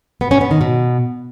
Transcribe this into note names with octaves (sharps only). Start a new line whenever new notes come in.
B3
C#4
B3
D#3
B2